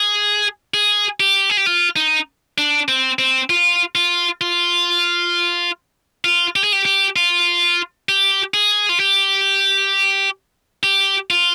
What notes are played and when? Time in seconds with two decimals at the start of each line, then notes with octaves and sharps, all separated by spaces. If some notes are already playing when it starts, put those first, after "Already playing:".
Already playing: G#4
0.74 G#4
1.20 G4
1.50 G#4
1.57 G4
1.66 F4
1.96 D#4
2.58 D4
2.88 C4
3.19 C4
3.50 F4
3.95 F4
4.41 F4
6.25 F4
6.56 G4
6.64 G#4
6.73 G4
6.85 G4
7.16 F4
8.09 G4
8.54 G#4
8.89 F4
9.00 G4
10.83 G4
11.30 F4